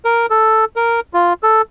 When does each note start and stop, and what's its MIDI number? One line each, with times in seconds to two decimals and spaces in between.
0.05 0.26 70
0.30 0.65 69
0.76 1.00 70
1.14 1.33 65
1.43 1.62 69